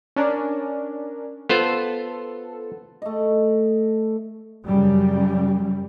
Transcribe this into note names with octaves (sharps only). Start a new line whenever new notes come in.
C#4 D4 A#4
B3 F4 A4 C5
A3 D#5
F#2 C#3 F#3 G3